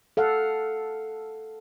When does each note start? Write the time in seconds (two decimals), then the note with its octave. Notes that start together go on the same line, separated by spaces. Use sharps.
0.17 A4 F5 F#5